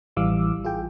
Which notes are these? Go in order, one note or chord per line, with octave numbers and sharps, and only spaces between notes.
A1 E3 G3 F5 D6 E6
F4 G#4 G5